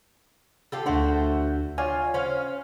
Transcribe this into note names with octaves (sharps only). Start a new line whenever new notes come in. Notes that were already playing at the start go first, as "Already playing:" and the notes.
F4 G4 A4
D2 A3 D4 F#4 C5
F4 C#5 D5 G#5
C#4 C5 F5